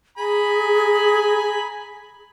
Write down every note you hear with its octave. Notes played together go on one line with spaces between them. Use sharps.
G#4 G#5 A#5 B5